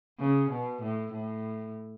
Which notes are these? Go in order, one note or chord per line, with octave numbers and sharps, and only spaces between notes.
C#3
B2
A2
A2